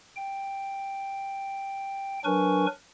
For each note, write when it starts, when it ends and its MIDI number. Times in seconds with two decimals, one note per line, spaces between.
0.16 2.19 79
2.24 2.66 54
2.24 2.66 62
2.24 2.66 70
2.24 2.66 71
2.24 2.66 80
2.24 2.66 85